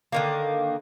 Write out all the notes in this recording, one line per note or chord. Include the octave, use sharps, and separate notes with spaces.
D3 D#3 A#3